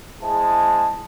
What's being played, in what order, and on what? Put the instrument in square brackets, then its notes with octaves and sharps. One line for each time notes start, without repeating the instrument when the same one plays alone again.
[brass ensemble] G#3 E4 G#4 C5 A5